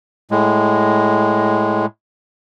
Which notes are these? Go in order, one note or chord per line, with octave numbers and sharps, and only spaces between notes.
A2 G#3